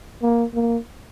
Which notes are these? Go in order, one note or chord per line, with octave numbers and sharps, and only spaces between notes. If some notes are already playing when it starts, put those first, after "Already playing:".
A#3
A#3